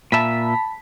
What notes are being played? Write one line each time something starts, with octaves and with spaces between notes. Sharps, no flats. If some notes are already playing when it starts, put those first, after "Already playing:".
A#2 E5 A5 B5 B6